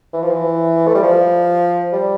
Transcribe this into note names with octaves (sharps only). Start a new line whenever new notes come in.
E3
F3
E3
A3
G3
F3
G3